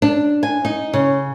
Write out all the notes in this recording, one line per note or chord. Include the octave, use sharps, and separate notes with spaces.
D4
G#5
D#4
C#3